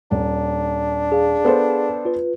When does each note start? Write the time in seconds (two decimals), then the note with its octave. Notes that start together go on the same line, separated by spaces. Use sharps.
0.11 D#1 D4
1.12 G#4 F5
1.45 B3 A4 C5
2.05 F4 B4